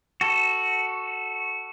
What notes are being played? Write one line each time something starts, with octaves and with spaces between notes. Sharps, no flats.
F#4 A4